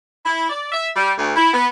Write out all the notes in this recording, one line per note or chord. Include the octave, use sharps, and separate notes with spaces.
E4
D5
E5
G3
D2
E4
B3